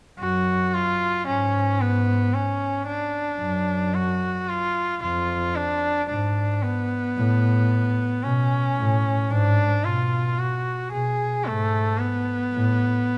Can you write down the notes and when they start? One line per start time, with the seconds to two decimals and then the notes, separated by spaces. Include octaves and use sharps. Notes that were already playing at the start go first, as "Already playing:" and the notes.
0.19 F#2 F#4
0.74 F4
1.27 G#2 C#4
1.81 B3
2.34 C#4
2.87 D4
3.41 F#2
3.94 F#4
4.49 F4
5.02 F2 F4
5.55 D4
6.09 G#2 D4
6.62 B3
7.17 A2
8.23 B2 C#4
8.77 A2
9.30 G#2 D4
9.85 B2 F4
10.38 F#4
10.91 B2 G#4
11.45 G#2 A3
11.98 B3
12.53 A2